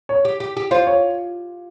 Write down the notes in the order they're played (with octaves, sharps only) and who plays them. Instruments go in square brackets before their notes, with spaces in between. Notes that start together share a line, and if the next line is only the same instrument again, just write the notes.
[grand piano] C#5
[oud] G4
G4
G4
[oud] F4 [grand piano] C5
[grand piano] C#5